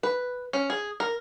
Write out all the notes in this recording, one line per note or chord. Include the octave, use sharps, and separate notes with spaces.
B4
C#4
G#4
A#4